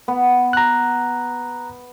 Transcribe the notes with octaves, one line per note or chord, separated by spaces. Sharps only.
B3
A#5 F#6